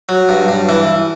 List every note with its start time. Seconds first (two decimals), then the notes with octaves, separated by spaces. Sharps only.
0.09 F#3
0.29 G2
0.48 G2
0.69 E3